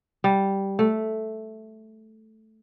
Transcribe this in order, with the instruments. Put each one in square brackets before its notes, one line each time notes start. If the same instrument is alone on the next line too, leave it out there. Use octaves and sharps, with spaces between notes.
[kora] G3
A3